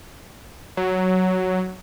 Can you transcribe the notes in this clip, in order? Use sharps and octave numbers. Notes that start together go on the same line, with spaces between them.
F#3